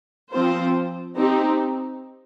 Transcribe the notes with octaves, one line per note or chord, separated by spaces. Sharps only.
F3 C4 F4 C5
C4 D#4 G4